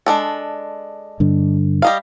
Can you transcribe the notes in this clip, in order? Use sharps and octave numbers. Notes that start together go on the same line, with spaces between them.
G#3 D4 A4
G2 D3
G3 D#5 F5